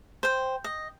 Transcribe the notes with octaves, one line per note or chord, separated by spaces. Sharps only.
C5 G5
D#5